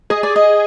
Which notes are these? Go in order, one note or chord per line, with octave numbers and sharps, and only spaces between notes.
G#4 D#5
D5
D#5